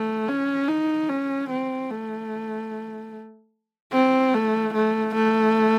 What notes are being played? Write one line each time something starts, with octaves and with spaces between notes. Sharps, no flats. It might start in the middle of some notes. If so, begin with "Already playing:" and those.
Already playing: A3
C#4
D#4
C#4
C4
A3
C4
A3
A3
A3